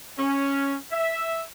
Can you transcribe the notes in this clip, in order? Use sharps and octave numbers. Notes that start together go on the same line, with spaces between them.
C#4
E5